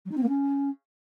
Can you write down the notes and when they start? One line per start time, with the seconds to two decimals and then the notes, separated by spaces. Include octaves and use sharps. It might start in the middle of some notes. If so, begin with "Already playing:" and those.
0.05 F#3
0.11 D#4
0.17 C4
0.23 A#3
0.28 C#4